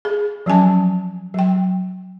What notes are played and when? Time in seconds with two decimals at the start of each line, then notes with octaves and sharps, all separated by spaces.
0.05 G#4
0.46 F3 F#3 C#4 G#5 A5
1.34 F#3 G5